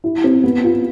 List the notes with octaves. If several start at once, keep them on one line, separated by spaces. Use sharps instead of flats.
E4
C4
B3
F4